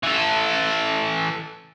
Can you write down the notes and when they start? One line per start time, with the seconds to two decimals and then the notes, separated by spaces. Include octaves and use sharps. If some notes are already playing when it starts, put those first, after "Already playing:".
0.03 E3 A4